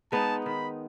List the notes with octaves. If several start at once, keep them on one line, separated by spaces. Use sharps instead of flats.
G#3 B3 D#4 A5
D#3 B5